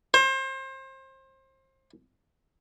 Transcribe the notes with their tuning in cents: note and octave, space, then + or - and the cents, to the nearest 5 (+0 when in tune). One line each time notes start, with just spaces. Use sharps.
C5 +30